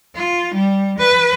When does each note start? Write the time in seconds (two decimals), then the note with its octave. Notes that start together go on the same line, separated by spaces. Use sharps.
0.15 F4
0.54 G3
0.98 B4